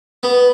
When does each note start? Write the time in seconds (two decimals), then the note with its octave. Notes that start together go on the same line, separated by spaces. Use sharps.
0.23 B3